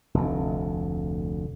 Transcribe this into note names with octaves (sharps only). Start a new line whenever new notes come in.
F1 D2